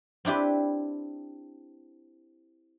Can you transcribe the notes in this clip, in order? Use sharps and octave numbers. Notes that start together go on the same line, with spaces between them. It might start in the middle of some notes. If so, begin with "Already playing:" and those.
C4 D4 E4 G4 B4